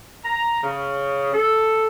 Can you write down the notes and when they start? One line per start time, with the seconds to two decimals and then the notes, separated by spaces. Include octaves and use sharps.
0.24 A#5
0.62 C#3
1.34 A4